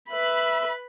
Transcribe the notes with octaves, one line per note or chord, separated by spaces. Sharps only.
B4 E5 B5